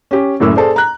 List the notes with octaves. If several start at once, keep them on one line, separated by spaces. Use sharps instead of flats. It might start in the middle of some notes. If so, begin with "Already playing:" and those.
C#4 G4
F#1 F#2 A2 D6 E6
G#4 A4 C5 D5
A#5 F#6